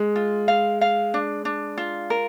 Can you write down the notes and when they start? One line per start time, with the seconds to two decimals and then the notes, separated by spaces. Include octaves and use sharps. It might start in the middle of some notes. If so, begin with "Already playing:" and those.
Already playing: G#3
0.16 F4
0.48 F5
0.81 F5
1.14 D4
1.45 D4
1.78 F4
2.10 A#4